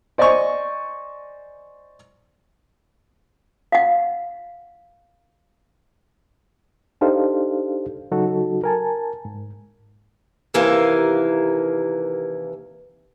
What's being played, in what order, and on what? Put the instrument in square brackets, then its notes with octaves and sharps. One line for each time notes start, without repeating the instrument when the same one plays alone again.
[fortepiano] C5 D5 D#5 G#5 C#6
[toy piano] F5 F#5
[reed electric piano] D4 D#4 G4 A4 C5 F5
C#3 F#3 D#4 F#4 A4
A#4 G#5 A5
G#2
[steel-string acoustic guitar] D#2 C3 E3 A#3 A#4 F5